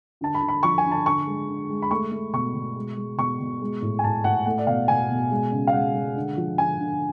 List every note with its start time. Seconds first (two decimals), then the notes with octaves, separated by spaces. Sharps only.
0.21 D3 A5
0.35 B5
0.42 D3
0.48 B5
0.63 F3 C#6
0.78 G#5
0.85 D3
0.92 A5
1.05 D3 C#6
1.27 G#3
1.48 D3
1.69 G#3
1.82 B5
1.91 A3 C#6
2.11 A3
2.33 B2 C#6
2.55 B2
2.76 G#3
2.97 G#3
3.18 B2 C#6
3.40 B2
3.61 G#3
3.82 A2
3.99 G#5
4.04 A2 A5
4.24 A2 F#5
4.46 A3 F#5
4.58 D5
4.67 B2 F5
4.88 B2 G#5
5.10 B2
5.31 G#3
5.52 C#3
5.67 F5
5.73 G#3 F#5
5.94 G#3
6.16 D3
6.37 F3
6.58 D3 G#5
6.79 D3